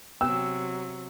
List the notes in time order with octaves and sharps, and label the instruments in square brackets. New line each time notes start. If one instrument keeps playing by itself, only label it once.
[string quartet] C3 F#3 [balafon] B3 [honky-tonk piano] E6